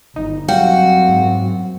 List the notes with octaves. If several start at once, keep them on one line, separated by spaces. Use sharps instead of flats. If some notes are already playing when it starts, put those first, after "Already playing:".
G1 D#4
F#2 G3 C4 F#4 F5 G5
G#2